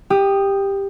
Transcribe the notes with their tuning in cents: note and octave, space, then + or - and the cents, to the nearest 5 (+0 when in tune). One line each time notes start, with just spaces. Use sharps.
G4 +10 D#6 -10